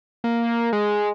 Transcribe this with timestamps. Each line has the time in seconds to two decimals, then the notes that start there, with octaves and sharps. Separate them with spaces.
0.24 A#3
0.73 G#3